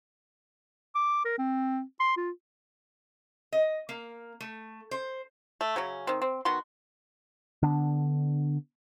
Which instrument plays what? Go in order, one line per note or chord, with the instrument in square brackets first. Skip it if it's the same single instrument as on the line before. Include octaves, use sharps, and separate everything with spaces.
[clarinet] D6
A#4
C4
C6
F4
[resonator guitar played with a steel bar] D#5
A#3
A3
C5
[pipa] A3
C#3 F#3 C#4
D#3 C4
C4
D#3 B3 F#4 C6
[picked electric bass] D3 B3 D4